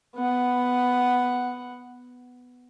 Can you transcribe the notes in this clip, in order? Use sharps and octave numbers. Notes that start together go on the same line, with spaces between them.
B3 F#5